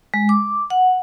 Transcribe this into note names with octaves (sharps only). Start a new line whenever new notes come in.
G#3
D6
F#5